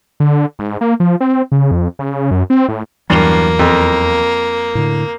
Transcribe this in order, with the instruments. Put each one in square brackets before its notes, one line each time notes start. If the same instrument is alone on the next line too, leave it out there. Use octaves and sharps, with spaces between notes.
[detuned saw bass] D3
G#2
A#3
F3
C4
C#3
F2
C#3
F#2
C4
A2
[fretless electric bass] E2 E3 F#3 [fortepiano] G2 [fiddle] A#3
[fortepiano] F2
[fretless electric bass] A2 D3